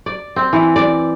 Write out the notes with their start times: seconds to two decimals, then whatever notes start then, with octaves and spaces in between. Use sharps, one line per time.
0.06 D5
0.36 C4
0.53 E3
0.76 D5